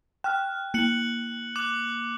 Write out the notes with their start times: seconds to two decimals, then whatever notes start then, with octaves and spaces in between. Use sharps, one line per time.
0.24 G5 F6 F#6
0.74 A#3 F#6 C#7 F#7
1.56 D6 F#6 F#7